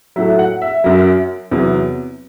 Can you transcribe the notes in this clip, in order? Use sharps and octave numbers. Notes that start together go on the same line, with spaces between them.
A2 F#3 E5
F#5
E5
F#2 F#3
E2 C3 F#3